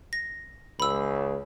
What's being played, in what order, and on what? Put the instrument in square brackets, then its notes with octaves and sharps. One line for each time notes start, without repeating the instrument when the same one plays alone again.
[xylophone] A#6
[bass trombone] C#2 [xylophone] B5 E6